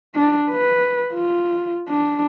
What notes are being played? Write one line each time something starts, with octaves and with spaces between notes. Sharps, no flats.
D4
B4
F4
D4